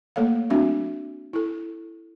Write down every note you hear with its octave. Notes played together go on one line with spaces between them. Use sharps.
A3 A#3 A4 C#5 F5
F#3 A3 C4 D4 F#4 E5
E4 A4